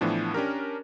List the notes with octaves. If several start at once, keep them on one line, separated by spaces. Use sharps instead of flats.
A2 E3 F3 B3 D4
C#4 D4 G4 A#4